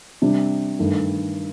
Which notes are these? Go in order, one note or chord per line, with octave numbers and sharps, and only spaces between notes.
C3 G3 D4
G2 D#3 A3